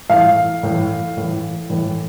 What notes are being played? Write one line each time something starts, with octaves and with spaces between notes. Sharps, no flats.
A2 E3 F5
A2 E3
A2 E3
A2 E3